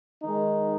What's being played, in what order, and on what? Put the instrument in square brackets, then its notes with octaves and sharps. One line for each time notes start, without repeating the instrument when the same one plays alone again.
[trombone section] D#3 G#3 D#4